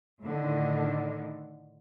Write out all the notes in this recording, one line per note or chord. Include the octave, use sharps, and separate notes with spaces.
A2 D3 D#3